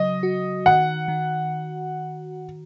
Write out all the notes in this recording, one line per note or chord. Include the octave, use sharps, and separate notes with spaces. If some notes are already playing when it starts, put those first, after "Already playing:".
Already playing: C#3 F#3 D#5
F#4
D#3 F#5
D#3